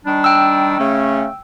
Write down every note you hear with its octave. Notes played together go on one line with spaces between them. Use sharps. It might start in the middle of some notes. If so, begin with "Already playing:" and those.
D#3 G3 D4
G5 E6
C#3 A3 C#4